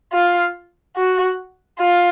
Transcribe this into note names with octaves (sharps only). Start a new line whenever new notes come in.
F4
F#4
F4